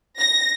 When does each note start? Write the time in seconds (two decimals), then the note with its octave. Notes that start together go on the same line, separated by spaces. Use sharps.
0.18 A#6